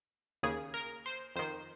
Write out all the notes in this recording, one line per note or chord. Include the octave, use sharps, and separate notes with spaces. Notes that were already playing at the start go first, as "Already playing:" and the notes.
D#2 C#3 G#4
A#4
C5
F2 D#3 C5